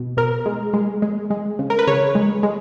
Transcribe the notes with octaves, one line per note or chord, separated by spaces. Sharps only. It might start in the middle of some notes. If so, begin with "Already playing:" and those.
Already playing: B2
B2 A#4
G#3
G#3
G#3
G#3
C#3
A#4
B4
C#3 C#5
G#3
G#3